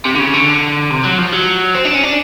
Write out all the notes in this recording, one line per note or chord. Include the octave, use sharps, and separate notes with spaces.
C3
D3
C#3
D3
C3
F#3
F3
F#3
C4
D4
C#4
D4